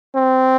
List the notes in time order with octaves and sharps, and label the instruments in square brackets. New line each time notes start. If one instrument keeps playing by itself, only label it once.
[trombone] C4